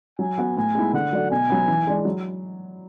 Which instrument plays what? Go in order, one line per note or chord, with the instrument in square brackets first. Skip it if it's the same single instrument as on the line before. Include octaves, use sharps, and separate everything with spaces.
[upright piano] F#3 [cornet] G#5
[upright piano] B3 F#4
[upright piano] A2 [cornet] G#5
[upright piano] G#3 B3 E4
[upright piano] D3 [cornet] F#5
[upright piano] F#3 A3 D4 F#4
[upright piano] B2 [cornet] G#5
[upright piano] F#3 B3
E3
G#3 D4
F#3